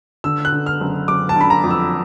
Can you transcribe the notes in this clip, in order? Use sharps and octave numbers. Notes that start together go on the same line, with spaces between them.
D3 E6
F#6
D3
F6
F#1
F#1 D6
A5
D3 B5
A#5
F2
E6